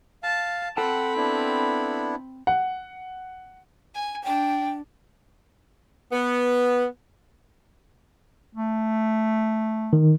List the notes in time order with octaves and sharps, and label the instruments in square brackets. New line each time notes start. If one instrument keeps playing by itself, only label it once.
[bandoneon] F5 [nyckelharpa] A5
[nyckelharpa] C4 B5 [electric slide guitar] A4 G5 A5 [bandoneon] F#5
[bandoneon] B3 D4 E4
[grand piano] F#5
[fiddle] G#5
[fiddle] D4 [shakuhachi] G5
[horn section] B3
[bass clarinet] A3
[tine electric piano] D#3